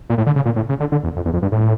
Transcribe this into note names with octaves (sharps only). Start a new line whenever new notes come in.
A#2
A2
D3
C#3
A#2
A2
C#3
D3
D3
E2
F2
E2
F2
G2
A2